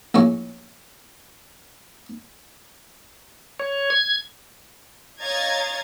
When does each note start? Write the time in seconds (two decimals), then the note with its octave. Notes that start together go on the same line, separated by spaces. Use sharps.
0.14 A#1 A2 C#4 C#6
3.59 C#5
3.90 G#6
5.22 C#5 D#5 F5 A#5 G#6 A6